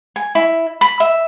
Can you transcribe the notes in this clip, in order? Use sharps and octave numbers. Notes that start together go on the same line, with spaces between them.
G#5
E4
B5
E5